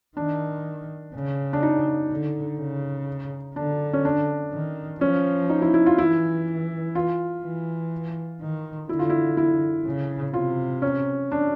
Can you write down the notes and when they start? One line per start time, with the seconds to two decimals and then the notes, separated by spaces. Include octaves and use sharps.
0.17 D#3 D4
1.14 C#3
1.53 D4
1.63 D#4
2.11 D3
2.59 C#3
3.56 D3 D4
3.93 C#4
4.05 D4
4.52 D#3
5.01 F3 C#4
5.50 D#4
5.62 E4
5.74 E4
5.86 F4
5.98 E3 E4
6.95 F4
7.44 E3
8.41 D#3
8.89 D3 E4
8.99 F4
9.10 E4
9.37 E4
9.86 C#3
10.34 C3 F4
10.82 C#4
11.32 D4